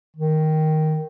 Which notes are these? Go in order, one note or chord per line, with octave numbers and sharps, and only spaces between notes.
D#3